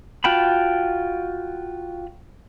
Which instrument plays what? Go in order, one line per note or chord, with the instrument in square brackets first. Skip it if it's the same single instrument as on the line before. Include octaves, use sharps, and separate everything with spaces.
[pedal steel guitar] F4 F#4 G5 A5 B5